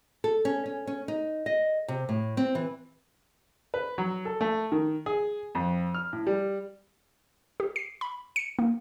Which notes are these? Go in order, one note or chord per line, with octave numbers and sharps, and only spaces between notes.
A4
C#4
C#4
C#4
D#4
D#5
C3
A2
C4
E3
B4
F#3
A4
A3
D#3
G#4
F2
F6
A2
G3
G4
C7
B5
C#7
A#3